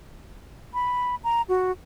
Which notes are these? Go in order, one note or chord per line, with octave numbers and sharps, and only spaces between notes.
B5
A#5
F#4